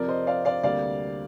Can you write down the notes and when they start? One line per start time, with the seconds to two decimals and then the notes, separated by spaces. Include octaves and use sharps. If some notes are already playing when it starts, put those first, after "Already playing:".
Already playing: F2 C3 F3 A#4 D5
0.08 C5 D#5
0.27 D5 F5
0.45 D5 F5
0.63 D2 C3 G3 A#3 D5 F5